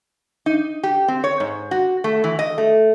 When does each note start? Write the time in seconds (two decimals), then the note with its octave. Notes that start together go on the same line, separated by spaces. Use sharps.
0.46 D#4
0.83 G4
1.08 C4
1.24 C#5
1.40 G#2
1.71 F#4
2.04 A3
2.24 E3
2.39 D#5
2.58 A3